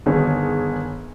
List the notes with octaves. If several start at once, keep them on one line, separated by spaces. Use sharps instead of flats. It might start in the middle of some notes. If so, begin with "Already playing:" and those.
G1 D#3 G#4 C#5